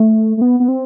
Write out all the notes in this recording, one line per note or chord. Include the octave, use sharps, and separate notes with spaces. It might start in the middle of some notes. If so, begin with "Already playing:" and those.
Already playing: A3
A3
B3
B3
C4